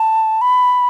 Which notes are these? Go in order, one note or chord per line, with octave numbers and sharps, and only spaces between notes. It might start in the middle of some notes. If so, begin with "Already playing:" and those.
Already playing: A5
B5